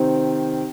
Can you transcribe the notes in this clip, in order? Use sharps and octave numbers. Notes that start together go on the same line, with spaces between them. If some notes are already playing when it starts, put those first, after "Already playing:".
Already playing: C3 D#3 C4 C5